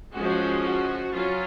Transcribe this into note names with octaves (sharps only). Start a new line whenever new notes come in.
F3 G#3 C#4 F#4
F#4
F#3 C#4 F4